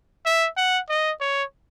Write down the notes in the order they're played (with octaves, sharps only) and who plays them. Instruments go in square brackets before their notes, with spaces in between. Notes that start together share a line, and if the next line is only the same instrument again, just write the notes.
[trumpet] E5
F#5
D#5
C#5